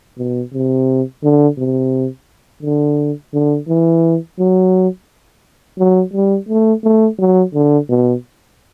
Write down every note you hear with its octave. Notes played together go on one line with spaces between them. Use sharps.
B2
C3
D3
C3
D3
D3
E3
F#3
F#3
G3
A3
A3
F#3
D3
B2